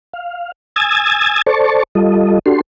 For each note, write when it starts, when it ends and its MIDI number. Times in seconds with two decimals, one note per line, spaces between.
0.13 0.52 77
0.76 1.42 80
0.76 1.42 87
0.76 1.42 88
0.76 1.42 92
0.76 1.42 93
1.46 1.83 69
1.46 1.83 72
1.46 1.83 74
1.46 1.83 81
1.46 1.83 85
1.95 2.39 55
1.95 2.39 65
1.95 2.39 69
1.95 2.39 75
2.46 2.61 62
2.46 2.61 66
2.46 2.61 67
2.46 2.61 69
2.46 2.61 84